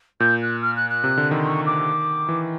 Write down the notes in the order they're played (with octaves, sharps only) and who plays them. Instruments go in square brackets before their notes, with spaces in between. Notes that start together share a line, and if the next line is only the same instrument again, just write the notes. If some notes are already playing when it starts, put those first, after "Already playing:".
[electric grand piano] A#2 [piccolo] G6
[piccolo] F#6
F6
F#6
F#6
[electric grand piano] C3
D3
[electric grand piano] D#3 [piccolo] C6
[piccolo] C#6
D6
[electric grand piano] E3